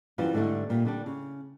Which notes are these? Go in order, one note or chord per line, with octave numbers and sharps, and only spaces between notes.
F#2 E3 G3 F4 C5
G#2 D3 G3 A3
A#2 G3
D3 G3 D4
C#3